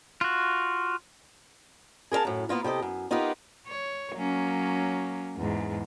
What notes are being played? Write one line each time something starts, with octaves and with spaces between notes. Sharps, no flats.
F4 F#4
G#4 A#4 B4 F5 A5
F#2 A2
A#3 B3 F4 A#4
C3 G4 A4 D#5
F#2
B3 D#4 F4 G4 A#4 B4
C#5
F#3 A#3 C#4
E2 G#2